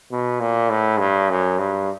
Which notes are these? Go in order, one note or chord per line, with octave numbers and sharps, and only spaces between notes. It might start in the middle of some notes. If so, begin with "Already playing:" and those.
B2
A#2
A2
G2
F#2
G2